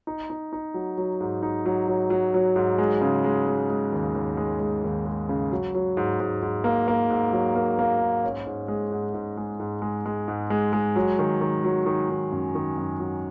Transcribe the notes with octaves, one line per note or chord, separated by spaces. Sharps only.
D#4
D#4
D#4
F#3
F#3
G#2
D#4
F#3
F#3
F#3
F#3
G#2
G#3
C#3
G#3
G#3
G#3
D#2
D#2
G#3
G#3
D#2
G#3
C#3
F#3
F#3
G#2
G#2
G#2
A#3
A#3
G#2
F#3
A#3
A#3
G#2
C#4
G#2
G#3
G#2
G#2
G#3
G#2
G#3
G#3
G#2
G#3
G#3
F#3
D#3
D#3
F#3
D#3
D#3
F#2
D#3
F#2
F#3